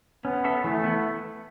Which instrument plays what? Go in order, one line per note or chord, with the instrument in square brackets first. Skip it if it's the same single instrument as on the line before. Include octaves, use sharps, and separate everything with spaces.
[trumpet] B3 [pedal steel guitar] C#4
[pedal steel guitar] A4 C#5 E5
[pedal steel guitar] E3 [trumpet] A3
[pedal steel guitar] B3 E4